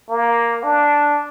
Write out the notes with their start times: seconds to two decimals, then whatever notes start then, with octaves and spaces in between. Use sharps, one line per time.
0.09 A#3
0.63 D4